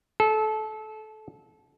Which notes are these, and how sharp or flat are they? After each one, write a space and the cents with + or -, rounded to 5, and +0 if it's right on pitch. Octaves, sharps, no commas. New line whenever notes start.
A4 -25